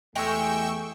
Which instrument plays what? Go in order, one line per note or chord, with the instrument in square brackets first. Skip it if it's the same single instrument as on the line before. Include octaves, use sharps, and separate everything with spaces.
[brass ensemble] E2 A3 [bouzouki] G#3 G4 G#4 [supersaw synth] G5 C#6 E6